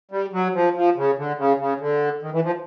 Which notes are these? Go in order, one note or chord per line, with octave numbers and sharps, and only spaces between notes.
G3
F#3
F3
F3
C#3
D3
C#3
C#3
D3
D#3
E3
F3